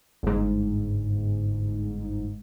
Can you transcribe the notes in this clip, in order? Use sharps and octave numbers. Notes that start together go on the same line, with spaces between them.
G1 G#2